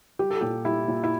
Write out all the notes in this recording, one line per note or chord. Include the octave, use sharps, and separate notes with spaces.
G3 G4
A4
A#2 G4
G3 E4
A#2
E4